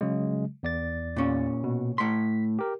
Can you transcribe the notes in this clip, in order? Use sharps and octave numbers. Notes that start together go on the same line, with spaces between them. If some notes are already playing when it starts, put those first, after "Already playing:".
C#3 F#3 G#3
E2 D5 A6
A#2 C#4
B2
A2 C6 B6
G4 A#4